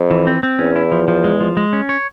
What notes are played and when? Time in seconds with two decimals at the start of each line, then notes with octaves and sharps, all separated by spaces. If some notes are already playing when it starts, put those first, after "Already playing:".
Already playing: F2
0.11 E3
0.27 C4
0.43 C4
0.59 E2 C#4
0.76 E4
0.92 F3
1.08 F3
1.24 G#3
1.41 F3
1.57 G#3
1.73 C#4
1.89 C#5